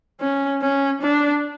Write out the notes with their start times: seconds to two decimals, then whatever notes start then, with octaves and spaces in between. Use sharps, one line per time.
0.21 C#4
0.62 C#4
1.02 D4